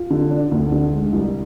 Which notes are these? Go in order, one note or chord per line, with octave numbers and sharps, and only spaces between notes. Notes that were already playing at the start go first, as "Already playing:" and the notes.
Already playing: F4
D3
D4
D2
D3
G#3
C2